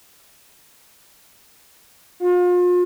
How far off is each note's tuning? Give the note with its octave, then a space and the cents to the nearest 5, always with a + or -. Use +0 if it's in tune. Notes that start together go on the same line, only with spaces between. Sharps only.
F4 +35